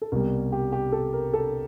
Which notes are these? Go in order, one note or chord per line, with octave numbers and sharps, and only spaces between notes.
A4
C2 B2 G3 A#4
G4
G4
A4
A#4
A4